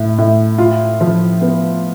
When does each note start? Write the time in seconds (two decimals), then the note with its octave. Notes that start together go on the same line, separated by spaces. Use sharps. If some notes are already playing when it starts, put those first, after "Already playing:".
Already playing: A2
0.18 A2
0.58 F4
1.01 F3
1.41 B3